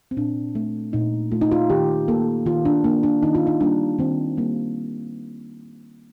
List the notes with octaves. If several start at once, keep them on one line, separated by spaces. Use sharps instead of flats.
C4
A#2 D4
A3
A#2 D#4
A3 F4
D#4
F4
D#3 G4
A#3 A4
D#3 F4
D4
A#3 D4
D4
D#3 D#4
F4
D#4
G3 A#3 D4
D#3 C4
G3 A#3